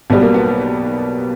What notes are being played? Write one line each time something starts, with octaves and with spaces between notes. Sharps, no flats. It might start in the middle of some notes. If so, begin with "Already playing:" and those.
B1 B2 G3 B3
A#3
B3